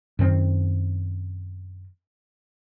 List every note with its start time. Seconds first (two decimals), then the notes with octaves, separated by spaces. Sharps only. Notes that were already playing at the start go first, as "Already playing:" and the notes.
0.19 F#2 D#3 C4